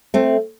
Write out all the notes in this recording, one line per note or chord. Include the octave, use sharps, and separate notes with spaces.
A3 C4